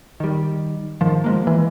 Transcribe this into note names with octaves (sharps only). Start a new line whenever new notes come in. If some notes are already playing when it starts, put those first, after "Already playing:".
D#3 G3
G#2 D#3 F3
F3 G#3 A#3
E3